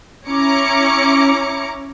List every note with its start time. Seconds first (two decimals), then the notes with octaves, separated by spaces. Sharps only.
0.28 C#4 E4 A#5 D6 C#7